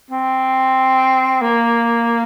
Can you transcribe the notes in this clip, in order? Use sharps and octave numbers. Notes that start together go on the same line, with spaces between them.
C4
A#3